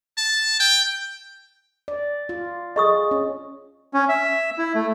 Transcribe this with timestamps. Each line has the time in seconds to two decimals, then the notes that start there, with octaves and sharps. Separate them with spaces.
0.18 A5
0.59 G5
1.88 D5
2.29 F4
2.76 G#4 D#5 C#6 D#6
3.11 C#4
3.94 C#4
4.09 E5
4.58 E4
4.75 A3